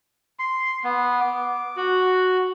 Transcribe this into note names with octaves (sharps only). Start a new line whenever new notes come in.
C6
B3
D6
F#4